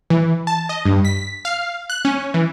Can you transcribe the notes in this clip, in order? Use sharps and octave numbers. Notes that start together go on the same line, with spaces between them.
E3
A5
D#5
G2
B6
F5
F#6
C#4
E3